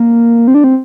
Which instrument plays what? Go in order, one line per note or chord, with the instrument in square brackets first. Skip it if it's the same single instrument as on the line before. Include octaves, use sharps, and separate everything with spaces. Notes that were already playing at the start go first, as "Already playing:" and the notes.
Already playing: [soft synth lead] A#3
C4
D4
C4